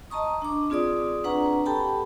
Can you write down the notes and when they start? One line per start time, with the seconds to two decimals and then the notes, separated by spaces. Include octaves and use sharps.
0.10 D#5 A5 A#5 C#6 D#6
0.42 D4 D6
0.70 C4 F4 G#4 D5 D#6
1.24 D4 B4 F#5 A#5 C#6
1.66 G4 A4 G5 A5 B5